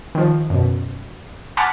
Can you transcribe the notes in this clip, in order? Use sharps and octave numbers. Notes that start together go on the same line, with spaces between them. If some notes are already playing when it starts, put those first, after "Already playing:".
D#3 F3
F#2 B2
F#5 G#5 A5 B5 D6 F6